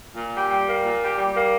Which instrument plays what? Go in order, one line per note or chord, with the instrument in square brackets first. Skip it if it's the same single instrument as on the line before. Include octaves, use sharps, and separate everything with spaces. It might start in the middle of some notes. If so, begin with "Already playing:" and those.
[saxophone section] A#2
G4
G3
A#3
A#2
G4
G3
A#3